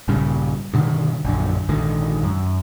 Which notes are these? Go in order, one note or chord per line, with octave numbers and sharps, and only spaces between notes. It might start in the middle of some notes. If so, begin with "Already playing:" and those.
A#1 G2 C#3 G3
G2 B2 D3 D#3
A#1 F#2 D3
A#1 G#2 D3 D#3
F#2